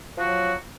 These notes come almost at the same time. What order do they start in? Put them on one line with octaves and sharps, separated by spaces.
F3 F#4 F#3